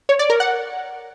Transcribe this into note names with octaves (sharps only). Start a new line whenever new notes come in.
C#5
D5
A#4
F#5